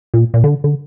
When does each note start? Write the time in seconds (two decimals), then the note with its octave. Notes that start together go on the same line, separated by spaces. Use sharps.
0.14 A#2
0.34 A#2
0.44 D3
0.64 D3